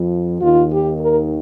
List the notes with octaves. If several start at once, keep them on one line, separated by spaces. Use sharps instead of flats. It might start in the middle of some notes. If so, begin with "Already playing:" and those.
Already playing: F2 F3
D#2 D#3 F4
G4
A#4